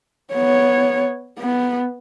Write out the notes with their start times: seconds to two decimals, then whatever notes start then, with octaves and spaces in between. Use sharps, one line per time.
0.33 B3 C#5
1.39 B3